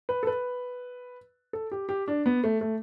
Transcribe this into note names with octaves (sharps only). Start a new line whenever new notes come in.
B4
A4
B4
A4
G4
G4
D4
B3
A3
A3